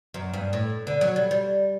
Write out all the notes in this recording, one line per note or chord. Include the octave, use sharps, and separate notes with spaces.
F#2
G2
A2
D3
F#3
G3
G3